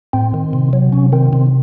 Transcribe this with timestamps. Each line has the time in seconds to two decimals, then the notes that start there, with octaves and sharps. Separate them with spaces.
0.13 A2 C4
0.34 D#3
0.53 C3
0.73 F#3
0.92 C3 C#4
1.12 D#3 C4
1.33 C3 C4